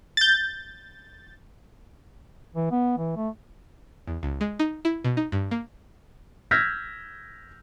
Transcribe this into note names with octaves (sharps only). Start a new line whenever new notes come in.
G6 A6
E3
B3
E3
A3
E2
C#2
G#3
D#4
E4
B2
D#4
G2
A#3
E6 F6 G6 G#6 A#6 B6